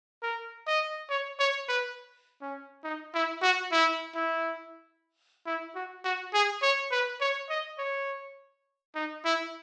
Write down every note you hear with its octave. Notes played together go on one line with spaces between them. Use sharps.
A#4
D#5
C#5
C#5
B4
C#4
D#4
E4
F#4
E4
E4
E4
F#4
F#4
G#4
C#5
B4
C#5
D#5
C#5
D#4
E4